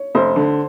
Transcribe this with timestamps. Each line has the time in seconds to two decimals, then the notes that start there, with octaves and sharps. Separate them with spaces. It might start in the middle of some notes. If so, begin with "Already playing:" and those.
Already playing: C#5
0.15 F1 C5
0.36 D3